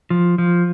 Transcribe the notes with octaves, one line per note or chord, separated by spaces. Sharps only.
F3
F3